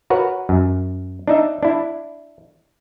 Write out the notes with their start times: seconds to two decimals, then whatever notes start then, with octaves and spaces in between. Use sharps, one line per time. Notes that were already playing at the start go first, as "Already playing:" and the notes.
0.10 F#4 A#4 B4 C#5 F#5
0.49 F#2
1.28 D4 D#4 E5
1.63 D4 E4